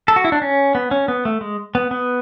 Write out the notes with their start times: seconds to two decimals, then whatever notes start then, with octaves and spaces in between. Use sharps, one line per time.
0.08 A4
0.16 F#4
0.25 E4
0.32 D4
0.42 C#4
0.75 B3
0.91 C#4
1.08 B3
1.25 A3
1.41 G#3
1.75 B3
1.91 B3